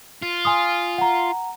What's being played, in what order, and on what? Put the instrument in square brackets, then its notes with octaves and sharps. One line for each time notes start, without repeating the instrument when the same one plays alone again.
[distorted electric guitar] F4
[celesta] G#5 C6 D#6
F#5 A#5